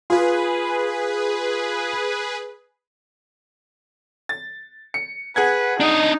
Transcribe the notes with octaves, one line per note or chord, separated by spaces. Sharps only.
F4 G#4 B4
A6
C#7
G#4 B4 F#5 G#6
D4 D#4 D#5